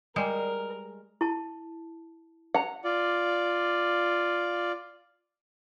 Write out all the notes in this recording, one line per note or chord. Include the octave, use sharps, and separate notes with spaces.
G3 G#3 A#4
E4 A5
F#5 A#5
F4 D5